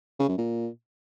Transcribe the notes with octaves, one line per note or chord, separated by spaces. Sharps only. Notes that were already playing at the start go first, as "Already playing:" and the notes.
C#3
F#2
A#2